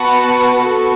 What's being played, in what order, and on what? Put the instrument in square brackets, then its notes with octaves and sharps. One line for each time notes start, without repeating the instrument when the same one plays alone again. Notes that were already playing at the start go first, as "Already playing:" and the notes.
Already playing: [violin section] B3 F#4 B4 F#5 A5
B3 F#4 A4